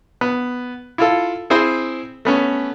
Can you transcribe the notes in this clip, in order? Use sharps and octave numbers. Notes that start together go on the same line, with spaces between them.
B3
E4 F4 A4
C4 E4 G#4 C5
A3 B3 C#4